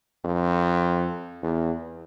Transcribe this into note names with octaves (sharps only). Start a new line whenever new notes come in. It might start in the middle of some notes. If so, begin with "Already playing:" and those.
F2
E2